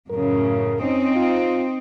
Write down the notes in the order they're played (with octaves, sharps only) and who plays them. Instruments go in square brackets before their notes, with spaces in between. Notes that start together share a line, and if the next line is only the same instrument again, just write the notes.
[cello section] F#2 A2 C#3 [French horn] A#4
[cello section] C4 D#4 [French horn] C#4
[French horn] F4